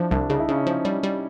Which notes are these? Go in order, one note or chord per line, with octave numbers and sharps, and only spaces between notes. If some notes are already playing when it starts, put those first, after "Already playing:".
Already playing: F3 D4 E4
C2 D4 E4
C#3 D#4
E4
C#3 C#4 D#4
F3
G3
G3